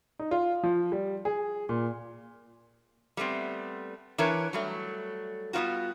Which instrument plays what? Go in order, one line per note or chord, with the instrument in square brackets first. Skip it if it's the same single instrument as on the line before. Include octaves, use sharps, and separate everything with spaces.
[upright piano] D#4
F4
F3
G3
G#4
A#2
[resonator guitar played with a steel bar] G3 A3 B3 C4
E3 D4 A#4 B4 C#5
F#3 G3 A3
G3 B3 C#4 F4 F#4